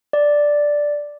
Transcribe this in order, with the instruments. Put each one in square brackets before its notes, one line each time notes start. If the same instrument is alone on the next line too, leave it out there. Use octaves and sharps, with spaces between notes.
[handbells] D5